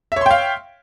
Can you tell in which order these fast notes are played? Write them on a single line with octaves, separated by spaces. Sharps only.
E5 C#5 C6 G5 F5